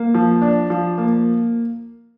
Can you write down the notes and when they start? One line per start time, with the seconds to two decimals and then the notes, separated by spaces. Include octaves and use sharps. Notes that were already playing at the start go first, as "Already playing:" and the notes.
Already playing: A#3
0.14 F3
0.42 D4
0.70 F3
0.98 A#3